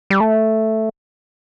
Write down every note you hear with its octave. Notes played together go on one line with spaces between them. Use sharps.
G3
A3